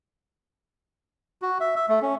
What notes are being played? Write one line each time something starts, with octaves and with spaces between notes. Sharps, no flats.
F#4
E5
E5
A3
C#4